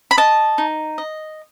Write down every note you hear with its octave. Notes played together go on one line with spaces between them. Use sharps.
B5
D#5 A5
D#4
D#5